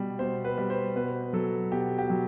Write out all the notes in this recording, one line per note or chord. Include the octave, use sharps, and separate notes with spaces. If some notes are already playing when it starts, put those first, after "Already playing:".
Already playing: B2 G3
B2 C5
B4
G3
C5
B2 B4
F#3 A4
B2 G4
G4
F#3